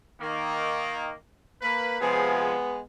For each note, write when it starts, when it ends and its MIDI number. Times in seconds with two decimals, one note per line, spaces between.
0.21 1.12 51
0.21 1.12 58
1.62 1.98 58
1.62 1.98 71
2.00 2.53 48
2.00 2.53 53
2.00 2.80 56
2.00 2.80 59
2.00 2.53 68